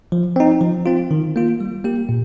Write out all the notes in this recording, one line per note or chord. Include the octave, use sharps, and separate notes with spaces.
F3
C4 D#4
F3
C4 F4
D#3
A#3 F4
G3
A#3 G4
A#2